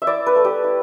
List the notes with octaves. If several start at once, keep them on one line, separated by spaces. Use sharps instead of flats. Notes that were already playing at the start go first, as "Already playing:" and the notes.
E5
E4 D5
B4
A3
G4
E4